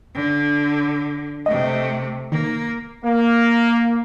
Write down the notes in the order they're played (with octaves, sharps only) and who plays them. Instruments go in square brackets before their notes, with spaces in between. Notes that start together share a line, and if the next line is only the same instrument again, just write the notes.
[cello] D3
[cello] C3 A3 [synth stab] D#5
[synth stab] D#3 [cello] A#3
[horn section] A#3